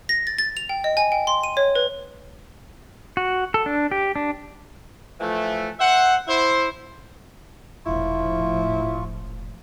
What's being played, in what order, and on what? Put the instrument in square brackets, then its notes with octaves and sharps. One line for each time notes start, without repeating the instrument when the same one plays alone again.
[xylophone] A#6
A6
A6
F7
G5
D#5
G#5
G5
C6
D#7
C#5
B4
[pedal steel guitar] F#4
A4
D4
G4
D4
[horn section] E3 F3 A3
C5 E5 F#5
E4 C5
[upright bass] E1 A#1 [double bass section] A2 F3 [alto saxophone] E4 [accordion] F4 C#6